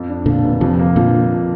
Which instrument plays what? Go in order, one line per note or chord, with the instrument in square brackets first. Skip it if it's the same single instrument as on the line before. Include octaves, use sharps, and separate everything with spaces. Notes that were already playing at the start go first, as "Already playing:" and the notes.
Already playing: [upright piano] F2
D4
[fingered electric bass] A#2 D3 [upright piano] F3
[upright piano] F1
[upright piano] F2 [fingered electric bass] C3 F3
[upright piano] A#3
[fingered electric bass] A#2 D3 [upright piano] F3